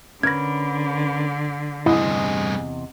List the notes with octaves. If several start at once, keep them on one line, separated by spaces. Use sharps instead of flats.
D3 C#4 A#4 B4 G#6 A#6
E2 G2 C3 E4 G#4 D#5